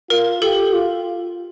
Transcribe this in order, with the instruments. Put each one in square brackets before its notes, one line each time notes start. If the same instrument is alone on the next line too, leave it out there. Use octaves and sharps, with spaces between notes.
[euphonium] F4 [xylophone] A#4
[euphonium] G4 [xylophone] A4
[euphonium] F4